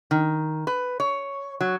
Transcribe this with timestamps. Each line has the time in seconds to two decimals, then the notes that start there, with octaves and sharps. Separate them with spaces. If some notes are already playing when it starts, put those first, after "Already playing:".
0.11 D#3
0.67 B4
1.00 C#5
1.61 F#3